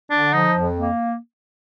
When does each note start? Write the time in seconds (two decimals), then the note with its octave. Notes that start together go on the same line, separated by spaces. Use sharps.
0.11 D3 D4
0.33 F3 D#4
0.55 F2
0.78 A#3